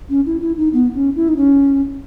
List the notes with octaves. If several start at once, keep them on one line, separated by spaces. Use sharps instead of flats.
C#4
E4
E4
D#4
B3
C#4
E4
D#4
C#4